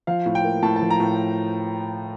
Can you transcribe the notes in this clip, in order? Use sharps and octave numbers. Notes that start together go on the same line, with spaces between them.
F3 F5
A2
G5
A#3
A2 A5
A5
F3
A#5
A2